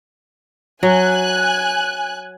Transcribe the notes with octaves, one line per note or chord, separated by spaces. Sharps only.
F#3 G#5 F#6